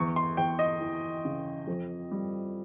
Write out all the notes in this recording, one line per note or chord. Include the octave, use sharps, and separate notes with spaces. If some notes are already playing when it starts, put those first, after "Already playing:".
Already playing: E2 C#6
C6
E2 G5
D#5
E3
C#3
F2
G3